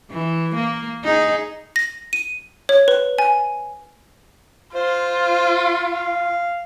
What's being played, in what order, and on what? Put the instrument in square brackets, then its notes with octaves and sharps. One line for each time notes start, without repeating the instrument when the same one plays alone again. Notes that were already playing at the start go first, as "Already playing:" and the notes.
[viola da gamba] E3
A#3
D#4 G#4
[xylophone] A#6
D#7
C#5
B4
G#5
[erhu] F4 [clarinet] C5
[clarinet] F5